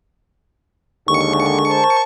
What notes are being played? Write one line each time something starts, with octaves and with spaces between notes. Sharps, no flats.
D#2 D3 G#3 C#6
A#4 C5 A5